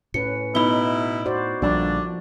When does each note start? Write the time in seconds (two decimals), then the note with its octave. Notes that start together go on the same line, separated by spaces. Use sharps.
0.14 A2 C#4 B4 C#7
0.55 B2 B3 D#4 E4 B5 G7
1.26 F#4 C5 D5
1.62 A#1 D3 F3 G3 D4 D5